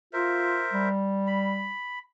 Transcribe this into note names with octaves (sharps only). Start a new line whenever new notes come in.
F4 A#4 C5 E5
G3
B5